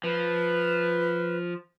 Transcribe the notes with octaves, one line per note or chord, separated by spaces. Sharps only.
F3 B4